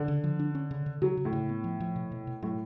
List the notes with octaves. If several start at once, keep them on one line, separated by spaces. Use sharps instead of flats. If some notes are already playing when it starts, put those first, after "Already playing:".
Already playing: D3
C#3
F3
D4
C#4
C#3
C#3
C#3 F#3
C#3
A2
C#3
B3
F3
F3
B2
B2
B2
A2 F#3